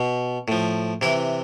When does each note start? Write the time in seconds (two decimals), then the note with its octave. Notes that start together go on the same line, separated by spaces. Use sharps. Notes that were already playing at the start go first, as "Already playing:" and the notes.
Already playing: B2
0.48 A2 F3
1.01 C3 E3 E4